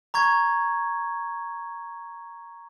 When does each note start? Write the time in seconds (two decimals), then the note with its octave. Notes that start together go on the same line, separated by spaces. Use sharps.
0.14 A#5 C#6 G#6